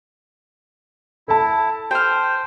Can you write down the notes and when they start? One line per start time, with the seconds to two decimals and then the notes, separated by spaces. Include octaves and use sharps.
1.28 E4 A4 A5
1.91 C5 G5 F6